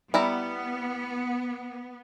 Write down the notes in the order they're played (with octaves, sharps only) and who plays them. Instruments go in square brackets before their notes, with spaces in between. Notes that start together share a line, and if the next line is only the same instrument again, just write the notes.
[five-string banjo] G3 E4 A#5 [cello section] B3